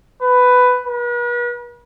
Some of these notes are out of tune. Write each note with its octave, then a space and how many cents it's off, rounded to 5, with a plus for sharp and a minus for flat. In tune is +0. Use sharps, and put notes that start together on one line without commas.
B4 +10
B4 -40